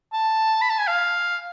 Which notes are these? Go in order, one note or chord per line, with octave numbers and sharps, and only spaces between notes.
A5
B5
A5
G#5
F5